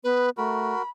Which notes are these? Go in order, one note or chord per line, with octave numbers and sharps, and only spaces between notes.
B3 B4
A3 F#4 A#4 B5